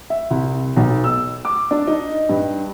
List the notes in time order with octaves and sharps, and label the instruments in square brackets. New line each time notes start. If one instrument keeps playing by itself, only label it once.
[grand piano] E5
C2
B1
E6
D6
D4
D#4
G2